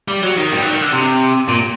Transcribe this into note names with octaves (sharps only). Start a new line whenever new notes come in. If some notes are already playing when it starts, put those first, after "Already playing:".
G3
F#3
D#3
G3
F#3
D#3
D3
C3
A#2